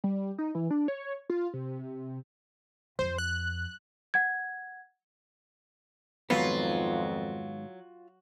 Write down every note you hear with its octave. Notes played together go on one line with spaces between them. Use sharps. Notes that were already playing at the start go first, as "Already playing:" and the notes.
G3
D#4
E3
D4
C#5
F4
C3
C3
F2 C5
F#6
F#5 G#6
F2 G#2 D#3 F#3 B3 F4